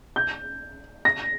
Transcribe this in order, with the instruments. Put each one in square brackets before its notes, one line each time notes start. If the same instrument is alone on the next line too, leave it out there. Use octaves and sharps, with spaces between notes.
[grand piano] G6
A#6